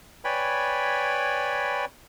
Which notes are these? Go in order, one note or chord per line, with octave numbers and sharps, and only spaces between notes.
B4 C#5 D5 G5 G#5 B5